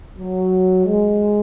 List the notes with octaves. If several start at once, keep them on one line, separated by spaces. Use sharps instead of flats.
F#3
G#3